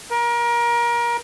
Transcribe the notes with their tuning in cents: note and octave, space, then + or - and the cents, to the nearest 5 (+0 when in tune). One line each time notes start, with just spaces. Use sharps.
A#4 +25